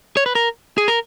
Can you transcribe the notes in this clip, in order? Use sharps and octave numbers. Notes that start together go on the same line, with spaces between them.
C#5
B4
A#4
G#4
A#4